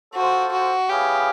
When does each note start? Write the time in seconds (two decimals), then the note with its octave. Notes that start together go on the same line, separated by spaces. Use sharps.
0.13 F4 F#4 A4 C5
0.52 F#4
0.88 B3 E4 G4 G#4 C#5 F5